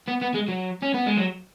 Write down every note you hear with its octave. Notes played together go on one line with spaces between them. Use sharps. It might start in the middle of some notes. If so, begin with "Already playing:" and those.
B3
B3
G#3
F#3
C#4
B3
G#3
F#3